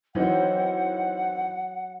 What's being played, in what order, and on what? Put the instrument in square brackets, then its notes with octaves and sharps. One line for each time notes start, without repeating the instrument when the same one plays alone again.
[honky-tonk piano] D#3 E3 C4 [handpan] F#3 [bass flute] F#5